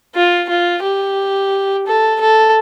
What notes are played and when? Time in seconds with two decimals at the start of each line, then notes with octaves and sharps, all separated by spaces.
0.15 F4
0.49 F4
0.83 G4
1.87 A4
2.20 A4